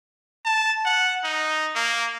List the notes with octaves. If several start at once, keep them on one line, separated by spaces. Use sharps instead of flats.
A5
F#5
D#4
A#3